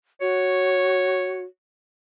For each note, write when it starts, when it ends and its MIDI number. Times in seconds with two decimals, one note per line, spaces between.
0.21 1.43 66
0.21 1.45 73